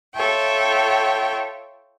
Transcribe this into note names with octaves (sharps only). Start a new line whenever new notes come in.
F4 A4 C#5 E5 G5